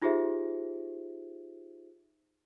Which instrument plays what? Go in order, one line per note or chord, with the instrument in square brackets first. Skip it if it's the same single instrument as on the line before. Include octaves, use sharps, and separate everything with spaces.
[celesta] D#4 F4 G4 G#4 C5 E5